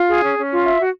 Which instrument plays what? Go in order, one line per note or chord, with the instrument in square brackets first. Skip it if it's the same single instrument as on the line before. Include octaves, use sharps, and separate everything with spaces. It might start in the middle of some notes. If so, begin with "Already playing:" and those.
Already playing: [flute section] F4
G#4
C#4
C#4
F4
E5
F#4